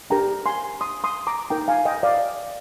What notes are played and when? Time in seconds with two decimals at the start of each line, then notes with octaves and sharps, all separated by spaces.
0.10 D4 G4 A#4 G5 A#5
0.46 G#5 C6
0.81 C6 D#6
1.04 C6 D#6
1.27 A#5 D6
1.50 D#4 A#4 G5 A#5
1.68 F5 G#5
1.85 D#5 G5
2.03 D5 F5